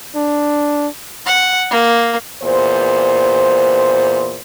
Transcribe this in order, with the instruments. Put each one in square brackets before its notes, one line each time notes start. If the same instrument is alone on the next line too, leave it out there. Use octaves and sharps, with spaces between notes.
[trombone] D4
[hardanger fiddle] F#5
A#3
[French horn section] E2 A#2 C5